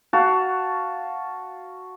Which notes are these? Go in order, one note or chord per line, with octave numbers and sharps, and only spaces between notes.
F#4 F5 A5